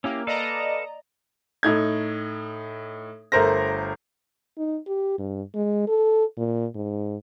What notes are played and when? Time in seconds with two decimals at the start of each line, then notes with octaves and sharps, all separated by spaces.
0.04 A#3 C#4 E4 G4
0.27 A4 B4 D5 D#5 F5 A#5
1.63 A2 D#4 G#6
3.32 G1 A3 A#4 C5 A#6
4.58 D#4
4.87 G4
5.19 G2
5.55 G#3
5.88 A4
6.37 A#2
6.75 G#2